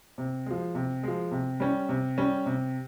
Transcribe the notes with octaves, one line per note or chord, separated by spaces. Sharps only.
C3
F3 G#3
C3
F3 G#3
C3
G3 C#4
C3
G3 C#4
C3